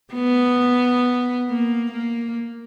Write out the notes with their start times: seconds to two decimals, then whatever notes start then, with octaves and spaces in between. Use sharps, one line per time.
0.14 B3
1.49 A#3
1.92 A#3